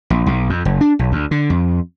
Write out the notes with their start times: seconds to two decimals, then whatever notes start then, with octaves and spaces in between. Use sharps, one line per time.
0.10 A#1
0.26 B1
0.50 F2
0.65 F#1
0.81 D4
0.99 B1
1.12 D2
1.31 D3
1.50 F2